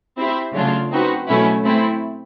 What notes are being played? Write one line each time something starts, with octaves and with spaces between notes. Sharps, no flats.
C4 E4 G4 C5 E5
C#3 F#3 A3 D4 F4
C4 D#4 F#4 B4
B2 F#3 A3 C#4 E4
A3 C4 E4